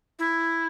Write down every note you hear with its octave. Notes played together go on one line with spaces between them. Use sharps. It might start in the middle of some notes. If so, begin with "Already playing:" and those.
E4